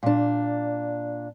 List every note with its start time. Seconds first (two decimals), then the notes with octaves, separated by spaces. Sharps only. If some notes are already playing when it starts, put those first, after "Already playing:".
0.03 A#2 D4